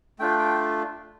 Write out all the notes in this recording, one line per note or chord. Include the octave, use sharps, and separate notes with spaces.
A3 D4 F4 G5
G5